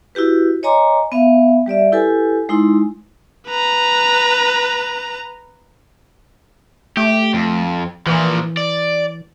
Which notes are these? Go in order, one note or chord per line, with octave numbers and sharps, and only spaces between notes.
E4 F#4 G4 B4
C#5 D#5 G#5 A#5 C6 D6
B3 E5 F5
G3 G4 D5 E5
E4 G4 A4 B4 G#5
G#3 D#4 E4 C6
B4 A#5
A3 G4
F2
A#2 E3 F3
D5